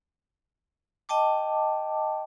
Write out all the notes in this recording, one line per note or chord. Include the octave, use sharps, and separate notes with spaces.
D#5 G5 A5 D6